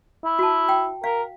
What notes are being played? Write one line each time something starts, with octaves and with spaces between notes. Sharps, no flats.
E4
F#4 A5
G5
A#4 F5